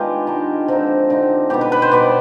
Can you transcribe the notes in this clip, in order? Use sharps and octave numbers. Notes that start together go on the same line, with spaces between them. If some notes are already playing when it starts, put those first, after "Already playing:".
Already playing: D#3 G#3 B3 D4 F4 G4 B4
D#3 G#3 D4
D3 F3 C4 D#4
D3 F3 C4 D#4
B2 G3 B3 G4
B4
B4
C5
B2 G3 B3 D5